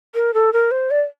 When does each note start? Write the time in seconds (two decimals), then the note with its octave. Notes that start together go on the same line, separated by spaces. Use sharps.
0.15 A#4
0.34 A4
0.53 A#4
0.71 C5
0.91 D5